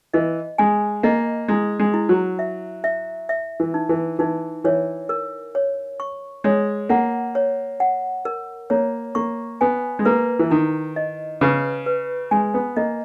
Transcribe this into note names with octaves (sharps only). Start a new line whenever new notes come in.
E3 D#5
G#3 G#5
A#3 D#5
G#3 E4
G#3
E4
F#3
E5
E5
E5
E3
D#4
E3
E3 D#4
E3 C#5
A#4
C#5
C#6
G#3 C#5
A#3 F#5
C#5
F#5
A#4
A#3 C#5
A#3 C#6
B3 G#5
G#3
A#3 B4
E3
D#3 E4
D#5
C#3 B4
B4
G#3 G#5
B3
A#3 D#5